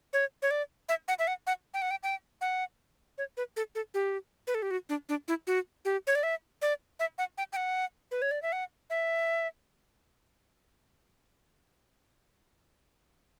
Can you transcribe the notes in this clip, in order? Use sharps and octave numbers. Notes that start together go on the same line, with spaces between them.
C#5
C#5
D5
E5
F#5
E5
F#5
F#5
G5
F#5
G5
G5
F#5
C#5
B4
A4
A4
G4
B4
A4
G4
F#4
D4
D4
E4
F#4
G4
C#5
D5
E5
D5
E5
F#5
G5
G5
F#5
B4
C#5
D5
E5
F#5
E5